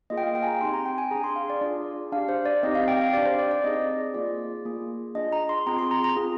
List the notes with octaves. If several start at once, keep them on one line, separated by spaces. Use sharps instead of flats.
A#3 F4 G#4 D#5
G5
F5
G5
G#5
A#5
C4 D#4 G4 C6
A#5
G5
G#5
D4 G#4 A#5
C6
F5
D5
D4 F4 G#4 D5
D4 G4 F5
C5
D5
C4 D#4 G4 D#5
F5
G5
F5
D4 G4 D5
C5
D5
D5
C4 D#4 G#4 D#5
A#3 F4 G#4 D5
A#3 F4 G#4
D4 F4 G#4 D#5
A#5
C6
C4 F4 G#4 A#5
C6
A#5
A#5
C4 F4 G#4